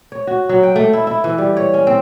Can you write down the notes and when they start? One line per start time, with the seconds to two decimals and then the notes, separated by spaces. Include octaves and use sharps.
0.12 C#5
0.27 F#4
0.49 F#3
0.63 G5
0.76 A3
0.93 E4
1.07 E4
1.24 E3
1.38 G3
1.57 C#5
1.74 C#4
1.87 C4